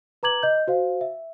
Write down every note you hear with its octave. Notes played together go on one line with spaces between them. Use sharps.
B4 A#5 D6 G#6 F#7
D#5 G6
F#4 C5 F5
E5